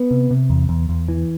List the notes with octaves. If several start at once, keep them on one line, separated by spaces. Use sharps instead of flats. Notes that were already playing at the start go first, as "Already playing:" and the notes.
Already playing: B3
C3
C3
E2
E2
E2
E3